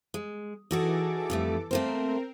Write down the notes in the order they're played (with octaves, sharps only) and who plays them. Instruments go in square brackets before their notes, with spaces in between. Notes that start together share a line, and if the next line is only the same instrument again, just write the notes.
[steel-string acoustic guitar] G#3
[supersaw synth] E3 A4 D6 [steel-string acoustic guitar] D#4 F#4 G#4
[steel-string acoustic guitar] F2 G3 A3
[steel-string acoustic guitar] A3 A#3 C5 [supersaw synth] C4 A#4